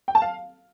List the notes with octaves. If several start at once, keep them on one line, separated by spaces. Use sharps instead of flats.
G5
A5
F5